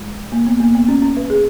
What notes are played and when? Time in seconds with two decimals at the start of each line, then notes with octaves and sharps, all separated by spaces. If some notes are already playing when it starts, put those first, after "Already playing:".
Already playing: G#3
0.32 A#3
0.47 B3
0.60 A#3
0.75 B3
0.88 C#4
1.02 C#4
1.17 B4
1.30 G#4